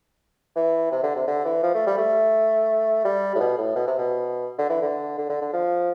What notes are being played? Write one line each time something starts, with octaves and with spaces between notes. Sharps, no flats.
E3
C3
D3
C3
D3
E3
F3
A3
G3
A3
G3
A2
B2
A2
B2
C3
B2
D3
E3
D3
D3
D3
D3
F3